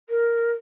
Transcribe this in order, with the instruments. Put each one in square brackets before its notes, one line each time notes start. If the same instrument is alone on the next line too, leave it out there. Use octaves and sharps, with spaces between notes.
[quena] A#4